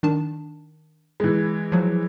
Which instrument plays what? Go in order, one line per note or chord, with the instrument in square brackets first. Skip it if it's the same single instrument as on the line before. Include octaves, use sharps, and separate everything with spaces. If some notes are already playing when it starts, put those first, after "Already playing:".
[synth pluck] D#3 D4 A5
[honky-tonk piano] E3 G#3
[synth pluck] F3 F#3